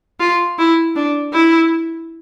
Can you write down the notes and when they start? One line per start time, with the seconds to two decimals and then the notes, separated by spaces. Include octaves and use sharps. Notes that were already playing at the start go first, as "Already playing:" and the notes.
0.20 F4
0.58 E4
0.96 D4
1.33 E4